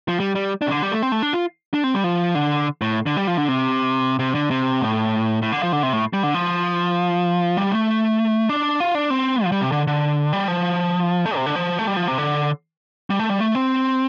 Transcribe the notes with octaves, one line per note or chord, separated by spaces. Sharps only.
F3
G3
G3
D4
C3
D3
G3
A3
C4
A3
D4
F4
D4
C4
G3
F3
D3
A2
D3
G3
F3
D3
C3
C3
D3
C3
A2
A2
D3
F3
D3
C3
A2
G3
D3
F3
G3
A3
D4
F4
D4
C4
F3
G3
C3
D3
D3
G3
F3
A3
C3
D3
F3
A3
G3
F3
C3
D3
G3
A3
G3
A3
C4